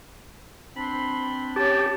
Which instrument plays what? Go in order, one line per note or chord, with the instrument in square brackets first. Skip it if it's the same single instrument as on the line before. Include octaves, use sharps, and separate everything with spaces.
[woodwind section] C4 D4 [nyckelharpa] B5 C6
[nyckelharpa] C#4 C#5 [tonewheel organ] G4 [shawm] A5